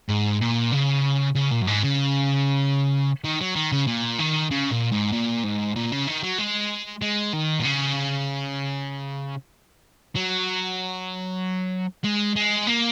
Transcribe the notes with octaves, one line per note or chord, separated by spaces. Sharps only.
G#2
A#2
C#3
C#3
A#2
F#2
G#2
C#3
D#3
F#3
D#3
C#3
A#2
D#3
C#3
A#2
G#2
A#2
G#2
A#2
C#3
D#3
F#3
G#3
G#3
D#3
A#2
C#3
F#3
G#3
G#3
A#3